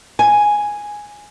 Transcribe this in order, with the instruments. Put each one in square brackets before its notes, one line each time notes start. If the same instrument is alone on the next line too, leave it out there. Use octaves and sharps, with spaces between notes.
[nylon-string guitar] G#5